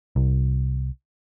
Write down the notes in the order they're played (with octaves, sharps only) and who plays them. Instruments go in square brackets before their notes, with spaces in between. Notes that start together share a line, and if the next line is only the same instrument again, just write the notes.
[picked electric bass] C2